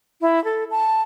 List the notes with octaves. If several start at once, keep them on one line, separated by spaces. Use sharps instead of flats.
E4
A4
A5